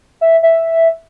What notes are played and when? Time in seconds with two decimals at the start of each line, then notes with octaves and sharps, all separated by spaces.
0.21 E5
0.43 E5